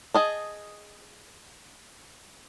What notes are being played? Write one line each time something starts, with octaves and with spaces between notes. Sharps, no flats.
G#4 D#5 A5